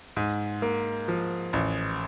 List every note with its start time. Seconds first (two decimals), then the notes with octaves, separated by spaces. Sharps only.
0.17 G#2
0.62 A#3
1.08 F3
1.53 A1